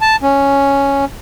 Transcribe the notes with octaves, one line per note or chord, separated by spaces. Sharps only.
A5
C#4